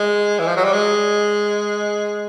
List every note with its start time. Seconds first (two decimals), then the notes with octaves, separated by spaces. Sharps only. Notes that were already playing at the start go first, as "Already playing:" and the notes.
Already playing: G#3
0.39 E3
0.47 F3
0.57 F#3
0.64 G3
0.73 G#3